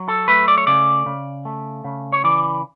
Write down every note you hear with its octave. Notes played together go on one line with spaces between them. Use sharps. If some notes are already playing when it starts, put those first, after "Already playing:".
Already playing: F#3
A4
A3 B4
D5
C#5
C#3 D5
C#3
A3
C#3
C#5
E3 D5